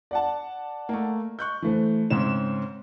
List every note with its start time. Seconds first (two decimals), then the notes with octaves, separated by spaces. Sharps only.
0.11 D5 F#5 A5
0.89 A3 A#3
1.39 C#6 F#6 G6
1.62 E3 A3 C5
2.10 G#2 C#3 C4 E7